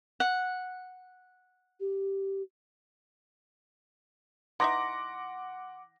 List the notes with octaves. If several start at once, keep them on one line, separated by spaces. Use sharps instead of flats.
F#5
G4
E3 D#4 E5 F#5 C6 D6 A#6